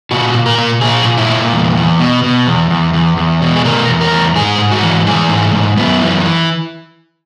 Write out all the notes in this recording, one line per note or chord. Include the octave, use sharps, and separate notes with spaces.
A#2 F#4
A#2
A#4
A#2
A#2 G#4
A#2
E4
A#2
E2
E2
B2
B2
E2
E2
E2
E2
B2
G#4
B2 A#4
E2
A#4
E2
G#2 G#4
G#2
F#4
E3
E3 G#4
G#2
G#2
F#2 B3
E3